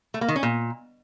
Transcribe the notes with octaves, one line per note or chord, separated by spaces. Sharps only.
A3
A#3
D#3
C#4
A#2